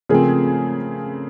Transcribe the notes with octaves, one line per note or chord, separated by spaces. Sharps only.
C#3 F3 A3 C4 G#4 A#4